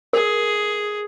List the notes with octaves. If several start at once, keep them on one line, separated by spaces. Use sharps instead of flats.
G#4 A#4